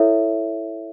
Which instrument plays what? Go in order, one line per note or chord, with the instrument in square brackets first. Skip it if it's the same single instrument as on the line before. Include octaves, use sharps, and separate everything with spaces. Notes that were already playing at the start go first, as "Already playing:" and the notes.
Already playing: [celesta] E4 A4 C#5 E5